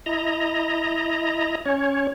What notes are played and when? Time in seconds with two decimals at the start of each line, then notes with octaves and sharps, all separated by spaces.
0.06 E4 D#5 A#5
1.65 C#4 C#5